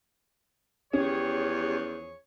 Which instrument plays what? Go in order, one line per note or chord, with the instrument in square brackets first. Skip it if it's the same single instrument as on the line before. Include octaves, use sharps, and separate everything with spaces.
[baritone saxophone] E2 [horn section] F3 G#4 C#5 [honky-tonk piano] C#4 [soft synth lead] G4